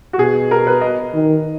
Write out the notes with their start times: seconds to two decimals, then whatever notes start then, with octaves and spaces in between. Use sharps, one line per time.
0.13 F#4
0.19 B2 G#4
0.51 A#4
0.67 B4
0.81 D#5
1.14 D#3